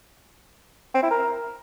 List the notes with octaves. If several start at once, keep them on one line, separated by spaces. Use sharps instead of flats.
C4
E4
A#4